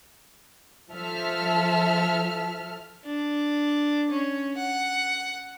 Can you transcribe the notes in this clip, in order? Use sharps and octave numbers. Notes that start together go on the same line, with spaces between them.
F3 A4 E5 F6
D4
C#4
F#5